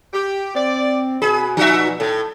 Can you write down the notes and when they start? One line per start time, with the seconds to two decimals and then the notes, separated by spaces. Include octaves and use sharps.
0.13 G4
0.55 C4 D5
1.22 B2 G#4 B5
1.57 F3 D#4 F#4 E5
2.00 A2 A4